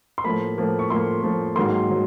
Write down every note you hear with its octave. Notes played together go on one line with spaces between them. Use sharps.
C6
A2 F3 A#3 B5
A2 F3 A#3
C#6
A2 F3 A#3 C6
A2 F3 A#3
G#2 D#3 F#3 A#3 C6
D#3 F#3